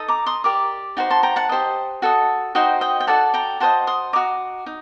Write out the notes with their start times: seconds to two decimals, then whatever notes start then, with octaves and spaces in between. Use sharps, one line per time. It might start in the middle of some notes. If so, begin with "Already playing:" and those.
Already playing: D#4 A4 D#5
0.08 A#5 D6
0.26 C6 D#6
0.44 G4 A#4 D5 A#5 D6
0.97 D#4 F#4 C5
1.10 A5 C6
1.23 G5 A#5
1.36 F#5 A5
1.49 G4 C5 D#5
2.02 F#4 A4 D#5
2.55 D#4 F#4 C5 D#5 G5
2.81 D#5 G5
3.00 G5
3.07 F#4 A4 D5 F#5 A5
3.34 G5 A#5
3.60 F#4 C5 D#5 A5 C6
3.87 C6 D#6
4.13 F#4 C5 D#5 A#5 D6
4.66 D#4